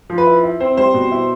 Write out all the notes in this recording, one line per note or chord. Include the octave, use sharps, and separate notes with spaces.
F3
B4
E4
E4
C4 C5
G3 C5
B2
E4